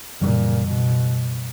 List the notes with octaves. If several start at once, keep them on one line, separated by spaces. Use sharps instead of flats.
F#2 A#2 C#3 E3 G3
B2